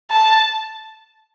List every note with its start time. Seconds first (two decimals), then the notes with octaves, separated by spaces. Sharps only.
0.10 A5